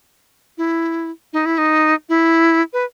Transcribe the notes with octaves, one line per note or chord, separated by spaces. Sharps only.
E4
D#4
E4
D#4
E4
B4